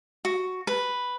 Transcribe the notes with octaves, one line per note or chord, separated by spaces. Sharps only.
F#4
B4